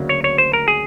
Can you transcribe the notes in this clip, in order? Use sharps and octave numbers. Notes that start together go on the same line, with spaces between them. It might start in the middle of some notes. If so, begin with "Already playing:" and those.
Already playing: D2 C#3 F#3 A#3
C#5
C#5
C5
A#4
G#4